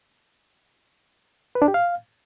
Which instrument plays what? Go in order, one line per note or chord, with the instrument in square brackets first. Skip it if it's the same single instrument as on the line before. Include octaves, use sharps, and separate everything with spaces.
[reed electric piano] B4
D4
G4
F5